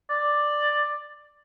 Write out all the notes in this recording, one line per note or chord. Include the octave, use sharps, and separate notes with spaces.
D5